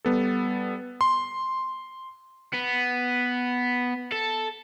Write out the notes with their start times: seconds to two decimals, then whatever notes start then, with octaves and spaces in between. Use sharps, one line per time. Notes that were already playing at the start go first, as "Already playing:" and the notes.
0.05 G3 B3 A4
1.01 C6
2.54 B3
4.12 A4